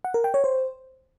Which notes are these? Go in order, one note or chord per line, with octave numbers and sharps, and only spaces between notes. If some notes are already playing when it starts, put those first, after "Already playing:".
F#5
A#4
G5
C#5
C5